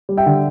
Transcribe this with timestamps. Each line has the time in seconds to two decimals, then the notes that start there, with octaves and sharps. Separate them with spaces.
0.09 G3
0.17 E5 G5
0.26 D3